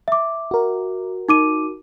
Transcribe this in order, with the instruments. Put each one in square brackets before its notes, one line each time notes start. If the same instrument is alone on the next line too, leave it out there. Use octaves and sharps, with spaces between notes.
[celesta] E5 D6
[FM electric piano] F#4 A#4
[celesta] D#4 D6 D#7